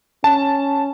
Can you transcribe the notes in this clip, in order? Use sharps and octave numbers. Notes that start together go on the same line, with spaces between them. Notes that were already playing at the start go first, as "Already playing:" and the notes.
C#4 A5